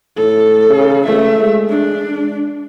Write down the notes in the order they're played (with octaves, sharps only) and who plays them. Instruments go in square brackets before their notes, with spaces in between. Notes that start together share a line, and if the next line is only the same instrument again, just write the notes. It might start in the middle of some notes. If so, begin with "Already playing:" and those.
[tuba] A2 [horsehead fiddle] A4
[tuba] C#3
[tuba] C#2 [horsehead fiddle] A3 E5
[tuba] G#3
[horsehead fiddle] D4